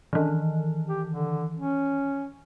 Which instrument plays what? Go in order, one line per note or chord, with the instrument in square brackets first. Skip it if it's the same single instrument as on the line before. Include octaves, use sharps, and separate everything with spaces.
[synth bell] D#3 E3
[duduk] G4
D3
C#4